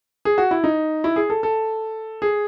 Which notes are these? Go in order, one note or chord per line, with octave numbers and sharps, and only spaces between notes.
G#4
F#4
E4
D#4
E4
G#4
A4
A4
G#4